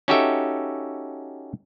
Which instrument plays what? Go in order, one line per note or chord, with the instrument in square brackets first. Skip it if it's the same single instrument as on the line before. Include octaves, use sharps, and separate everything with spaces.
[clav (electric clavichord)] C#4 D#4 F#4 G4 A4 E5